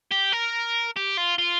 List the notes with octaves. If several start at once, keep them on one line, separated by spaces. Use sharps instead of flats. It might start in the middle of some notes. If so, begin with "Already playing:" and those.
G4
A#4
G4
F4
F4